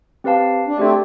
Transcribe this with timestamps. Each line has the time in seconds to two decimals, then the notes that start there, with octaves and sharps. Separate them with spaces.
0.24 C4 G4 B4 F5 A5
0.67 D4
0.78 A3 C4 D4 G4 D5